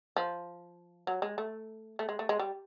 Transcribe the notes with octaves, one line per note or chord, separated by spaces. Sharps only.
F3
F#3
G#3
A3
A3
G#3
A3
G#3
G3